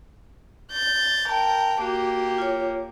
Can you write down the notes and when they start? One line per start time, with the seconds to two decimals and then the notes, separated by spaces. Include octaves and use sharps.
0.72 G6 A6
1.28 A#4 G5 A5
1.81 A#3 F#4 G4
2.38 F4 C#5